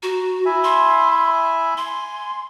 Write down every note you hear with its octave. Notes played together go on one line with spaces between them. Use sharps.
F#4 A#5
E4 E5 G#5
C6
G#5 C6